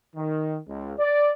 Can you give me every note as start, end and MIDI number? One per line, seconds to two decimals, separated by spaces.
0.16 0.58 51
0.68 0.94 37
0.99 1.33 74